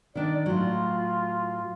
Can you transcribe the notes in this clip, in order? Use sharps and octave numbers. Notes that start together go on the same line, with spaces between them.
D#3 D4 D#4 D5
A2 F#3 F4